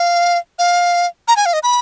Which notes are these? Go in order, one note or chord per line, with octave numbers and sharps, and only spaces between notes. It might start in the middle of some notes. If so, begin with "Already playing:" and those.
Already playing: F5
F5
A#5
G#5
F5
D#5
B5